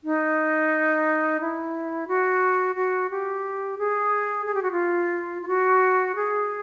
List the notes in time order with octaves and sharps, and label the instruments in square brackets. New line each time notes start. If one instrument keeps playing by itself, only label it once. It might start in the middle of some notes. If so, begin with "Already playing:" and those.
[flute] D#4
E4
F#4
F#4
G4
G#4
G#4
G4
F#4
F4
F4
F#4
G#4